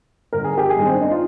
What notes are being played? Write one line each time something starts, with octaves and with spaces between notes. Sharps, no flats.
G1 A#4
G#4
G4
G#4
G2 D#3 G#3
C4
D4
D#4
F4